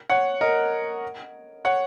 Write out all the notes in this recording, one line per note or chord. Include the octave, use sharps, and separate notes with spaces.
C#5 F#5
A#4 D#5
C#5 F#5